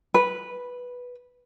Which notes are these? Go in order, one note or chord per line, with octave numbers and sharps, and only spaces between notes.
B4